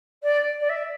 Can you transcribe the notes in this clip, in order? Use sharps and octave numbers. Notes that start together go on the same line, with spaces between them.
D5
D5
E5